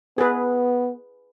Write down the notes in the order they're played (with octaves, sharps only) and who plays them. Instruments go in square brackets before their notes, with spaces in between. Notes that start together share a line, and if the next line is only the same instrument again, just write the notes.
[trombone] B3 [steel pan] G#4 B4